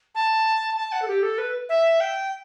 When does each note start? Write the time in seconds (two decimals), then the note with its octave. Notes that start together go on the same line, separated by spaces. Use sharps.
0.15 A5
0.76 A5
0.92 F#5
1.02 A4
1.08 G4
1.23 A4
1.38 B4
1.69 E5
2.01 G5